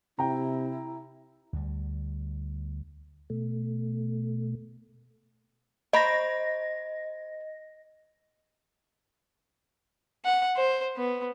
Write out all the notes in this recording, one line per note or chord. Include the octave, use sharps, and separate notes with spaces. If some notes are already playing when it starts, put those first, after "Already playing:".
C3 E4 G5 A#5
D2 G3
B2 A3
C5 D#5 A#5 B5 A#6
F#5
C5
B3